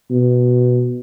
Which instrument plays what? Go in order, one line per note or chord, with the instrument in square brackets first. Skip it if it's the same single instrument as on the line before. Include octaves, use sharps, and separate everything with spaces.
[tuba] B2